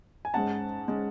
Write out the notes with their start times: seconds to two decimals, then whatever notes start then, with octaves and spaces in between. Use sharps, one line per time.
0.25 G#5
0.34 G#2 G#3 C#4 F#5 A5
0.88 G#3 C#4